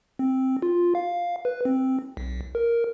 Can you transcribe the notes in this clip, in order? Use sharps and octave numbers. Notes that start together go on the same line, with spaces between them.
C4
F4
F5
B4
C4
B1
A#4